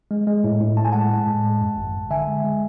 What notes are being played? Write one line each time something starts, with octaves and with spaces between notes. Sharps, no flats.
G#3
G#3
A2
A2
A2 A5
G#5
G#3 F#5 A5
G#3
A2
G#3
F#2
G#1
G#1
D3 E5 G#5
G#3
G#3